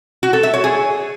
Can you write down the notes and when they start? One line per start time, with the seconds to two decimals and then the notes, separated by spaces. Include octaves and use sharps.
0.23 F#4
0.33 A4
0.43 E5
0.54 C#5
0.64 G#4